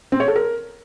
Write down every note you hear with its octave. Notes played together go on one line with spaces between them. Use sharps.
C4
C#5
A4
A#4